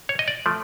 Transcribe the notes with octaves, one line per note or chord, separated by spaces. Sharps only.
C#5
D#5
D5
F3 A3